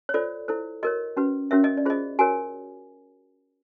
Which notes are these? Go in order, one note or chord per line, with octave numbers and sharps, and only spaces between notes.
C#5
F4 A4 C5 D5
E4 A4 C5
F#4 A#4 C#5 D#5
C#4 F#4 B4
C#4 F#4 A#4 C#5 E5
D#5
D5
F4 G#4 C5 D#5
F#4 A#4 C#5 G#5